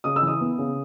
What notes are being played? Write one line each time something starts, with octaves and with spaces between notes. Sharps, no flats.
C#3 D#6
E6
E3
D#6
B3
C#3